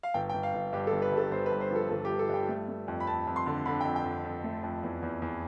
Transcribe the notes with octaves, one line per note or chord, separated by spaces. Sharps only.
F5
G1 G5
G5
G1
F5
G1
G2 G4
A4
G1
B4
G2
A4
G1 C5
B4
G2
C5
F3 A4
G1 A4
G4
G1
A4
G2 G5
A3
A3
F2
B5
F2 A5
F2
C6
D3
D3 B5
G5
F2
G5
F2
F2
A3
F2
E2
E2
E2